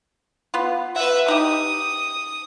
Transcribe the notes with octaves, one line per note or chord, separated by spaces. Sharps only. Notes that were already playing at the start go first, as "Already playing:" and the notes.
B3 F4
B4 E5 F#5
D#4 G4 D#6